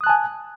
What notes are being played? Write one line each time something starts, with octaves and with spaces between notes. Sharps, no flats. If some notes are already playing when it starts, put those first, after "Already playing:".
G#5 A5 D#6 F#6